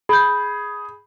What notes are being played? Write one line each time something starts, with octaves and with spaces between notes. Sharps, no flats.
G#4 B5 G6